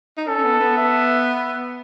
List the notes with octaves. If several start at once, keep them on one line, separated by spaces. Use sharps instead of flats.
D#4
C#4 A4
C#4
B3
B3
E5